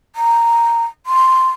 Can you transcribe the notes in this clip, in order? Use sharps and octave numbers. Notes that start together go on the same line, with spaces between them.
A#5
C6